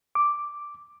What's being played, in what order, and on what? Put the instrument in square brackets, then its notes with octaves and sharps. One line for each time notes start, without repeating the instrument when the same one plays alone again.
[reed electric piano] D6